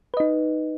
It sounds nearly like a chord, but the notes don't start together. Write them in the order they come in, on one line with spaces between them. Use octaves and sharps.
B4 D#5 D#4